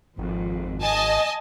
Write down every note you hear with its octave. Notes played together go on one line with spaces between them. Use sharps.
G#1 F2
D#5 G#5 A5